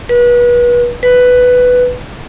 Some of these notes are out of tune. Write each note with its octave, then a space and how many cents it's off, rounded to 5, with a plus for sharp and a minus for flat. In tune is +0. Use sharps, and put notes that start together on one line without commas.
B4 -30
B4 +5